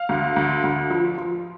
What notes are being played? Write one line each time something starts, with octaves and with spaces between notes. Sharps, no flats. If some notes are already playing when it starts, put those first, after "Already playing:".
Already playing: F5
D2
D2
D2
F3
F3